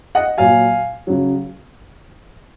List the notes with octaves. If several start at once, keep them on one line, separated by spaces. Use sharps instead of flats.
D#5 F#5
A#2 F#3 F5 G#5
C#3 F#3